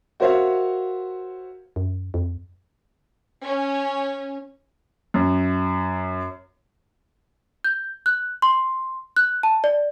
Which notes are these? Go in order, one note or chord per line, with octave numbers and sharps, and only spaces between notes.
F#4 A#4 C5 C#5 E5 F5
F#2
F2
C#4
F#2
G6
F#6
C6
F#6
A5
D5